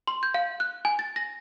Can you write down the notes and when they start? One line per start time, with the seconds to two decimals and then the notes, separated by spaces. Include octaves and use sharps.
0.07 C6
0.23 G6
0.34 F5
0.60 F#6
0.85 G#5
0.99 A6
1.16 A#6